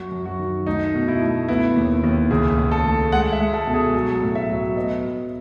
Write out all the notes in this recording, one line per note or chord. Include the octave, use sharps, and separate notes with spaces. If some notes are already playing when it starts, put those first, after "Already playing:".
Already playing: F#2 F#4
F#2
F#4
D#3
A3 D#4
B2
E4
A3
B3 E4
D#2
D#2
C#2 G#4
C#2
A4
A3
G#3 F#5
E5
G#3
A4
B2
G#4
F#3 A4
A2
E5
F#3
B3 D#5
F#3